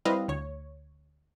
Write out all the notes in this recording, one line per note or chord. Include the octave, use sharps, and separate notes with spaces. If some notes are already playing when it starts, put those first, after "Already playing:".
G3 C4 E4 B4 D#5 F5
D2 C#5